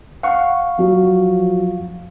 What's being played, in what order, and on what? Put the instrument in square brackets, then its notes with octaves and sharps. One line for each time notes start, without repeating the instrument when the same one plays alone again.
[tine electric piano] F5 F#5 C#6
[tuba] F3 [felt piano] F#3